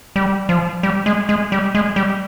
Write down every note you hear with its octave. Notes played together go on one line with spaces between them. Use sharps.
G3
F3
G3
G#3
G#3
G3
G#3
G3